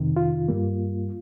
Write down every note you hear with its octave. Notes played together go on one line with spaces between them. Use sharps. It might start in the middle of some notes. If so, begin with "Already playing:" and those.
Already playing: F2 C3 D#3
F4
G2 G3 A#3